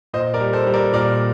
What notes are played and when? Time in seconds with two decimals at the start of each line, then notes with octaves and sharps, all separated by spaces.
0.13 A#2 C5 D#5
0.34 A#4 D5
0.40 G3
0.53 A4 C5
0.67 G3
0.74 A#4 D5
0.93 A#2 A#4 D5